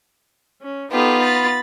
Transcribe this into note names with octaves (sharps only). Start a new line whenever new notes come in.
C#4
B3 D#4 F4 G4 A4
B5 A6